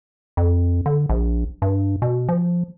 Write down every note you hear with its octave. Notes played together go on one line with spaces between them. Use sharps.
F2
D3
A#1
G2
B2
F3